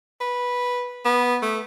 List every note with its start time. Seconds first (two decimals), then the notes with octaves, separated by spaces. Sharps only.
0.21 B4
1.05 B3
1.42 A3